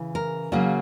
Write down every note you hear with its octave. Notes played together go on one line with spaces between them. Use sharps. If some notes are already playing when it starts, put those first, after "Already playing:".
Already playing: C#3 E3
A#4
C#3 F#3 A#3